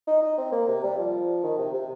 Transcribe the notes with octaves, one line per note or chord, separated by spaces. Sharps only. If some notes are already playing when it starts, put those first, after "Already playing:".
D#4
D#4
C4
A#3
C3
G3
F3
D#3
C3
C3